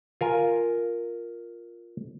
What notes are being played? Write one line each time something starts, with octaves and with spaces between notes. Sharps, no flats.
F4 A#4 G#5